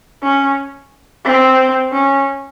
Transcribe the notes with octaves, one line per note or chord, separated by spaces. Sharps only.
C#4
C4
C#4